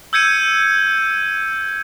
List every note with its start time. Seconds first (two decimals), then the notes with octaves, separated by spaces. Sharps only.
0.13 E6 G6 G#6 C#7 D#7